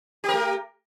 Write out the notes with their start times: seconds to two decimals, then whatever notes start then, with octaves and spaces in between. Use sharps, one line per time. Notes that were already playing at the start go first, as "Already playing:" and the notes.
0.24 G4
0.29 A#4
0.33 A3